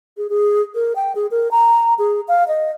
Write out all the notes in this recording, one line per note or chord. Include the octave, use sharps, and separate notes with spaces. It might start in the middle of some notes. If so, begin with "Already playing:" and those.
G#4
G#4
A#4
G5
G#4
A#4
A#5
G#4
F5
D#5